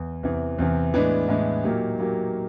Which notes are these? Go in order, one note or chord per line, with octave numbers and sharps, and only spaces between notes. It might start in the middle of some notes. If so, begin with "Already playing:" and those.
Already playing: E2
E2 C3 E3
E2 C3 E3
A2 E3 G#3 B3 D4
A2 E3 G#3 B3 D4
A#2 F#3 A#3 D#4 G4
A#2 F#3 A#3 D#4 G4